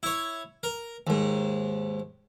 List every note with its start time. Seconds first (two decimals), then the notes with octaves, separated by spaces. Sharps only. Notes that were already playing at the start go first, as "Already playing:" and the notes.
0.03 E4 C#5
0.63 A#4
1.07 D#2 G#2